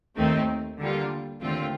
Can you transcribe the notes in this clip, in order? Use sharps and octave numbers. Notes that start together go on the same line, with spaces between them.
D#2 D#3 A3 C4 D#4
D3 G3 A#3 F4
D#2 D3 A3 C4 F4